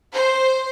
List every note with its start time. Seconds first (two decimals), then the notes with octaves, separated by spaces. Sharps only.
0.14 C5